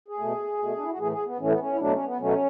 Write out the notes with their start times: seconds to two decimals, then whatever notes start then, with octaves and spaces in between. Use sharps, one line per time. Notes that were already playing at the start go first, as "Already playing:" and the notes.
0.08 G#4
0.18 B2 A3
0.59 B2 A3
0.76 D4
0.83 E4
0.91 F#4
0.99 A2 E3 A3 G#4
1.12 G#4
1.25 B3
1.39 A2 E3 A3 C#4
1.49 B3
1.59 C#4
1.73 E4
1.79 B2 F#3 A3 D4
1.93 C#4
2.05 B3
2.19 B2 F#3 A3 C#4